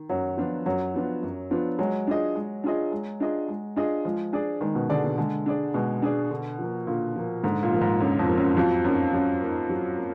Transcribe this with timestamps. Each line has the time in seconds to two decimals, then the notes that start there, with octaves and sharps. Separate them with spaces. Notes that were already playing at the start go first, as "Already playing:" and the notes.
Already playing: D#3
0.09 F#2 F#3
0.37 F3 B3 D4 F4
0.66 F#2 F#3
0.94 F3 B3 D4 F4
1.23 F#2
1.51 F3 B3 D4 F4
1.79 F#3 G#3
2.07 D4 F4 G#4 D#5
2.35 G#3
2.64 D4 F4 G#4 D#5
2.92 G#3
3.20 D4 F4 G#4 D#5
3.48 G#3
3.76 D4 F4 G#4 D#5
4.05 F3 G#3
4.33 D4 G#4 D5
4.61 D#3 G#3
4.75 B2
4.89 D3 D4 G#4 D5
5.04 B2
5.18 D3 G#3
5.46 D4 G#4 D5
5.74 B2 G#3
6.02 D4 G#4 D5
6.31 D3
6.59 F3 A#3
6.87 A#2 D3
7.16 F3 A#3
7.43 G#2 D3
7.63 A#2
7.72 F3 A#3
7.81 G#2
8.00 F#2 D3
8.19 F2
8.28 F3 A#3
8.37 F#2
8.57 F2 F#3
8.84 F#2 A#3 D#4
9.13 F#2 F#3
9.42 A#3 D#4
9.69 F#3
9.97 A#3